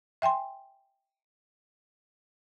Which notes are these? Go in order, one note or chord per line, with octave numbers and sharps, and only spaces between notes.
E5 G5 G#5 C6